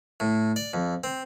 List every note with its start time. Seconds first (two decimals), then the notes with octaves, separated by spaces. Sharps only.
0.20 A2
0.56 D5
0.74 F2
1.04 C4